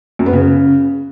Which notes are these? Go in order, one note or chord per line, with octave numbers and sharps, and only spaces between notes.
F#2
B3
C#3